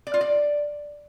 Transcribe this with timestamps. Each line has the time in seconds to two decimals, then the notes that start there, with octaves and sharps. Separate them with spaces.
0.07 D5
0.14 F4
0.21 D5